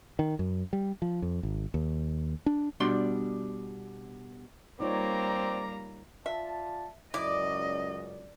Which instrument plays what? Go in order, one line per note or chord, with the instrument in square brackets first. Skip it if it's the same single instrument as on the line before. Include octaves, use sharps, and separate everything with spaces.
[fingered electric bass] D#3
F#2
G3
F3
F2
G#1
D#2
D4
[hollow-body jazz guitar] B2 G3 D4 C6
[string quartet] G3 A#3 A#5 [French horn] C4 [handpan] D#4 F4 C#5 [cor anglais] D5
[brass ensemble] F4 D5 A5 [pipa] E5
[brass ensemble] C#2 F#2 [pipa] E4 [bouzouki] D5 [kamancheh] D#5